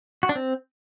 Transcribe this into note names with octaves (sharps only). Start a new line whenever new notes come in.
F#4
D4
C4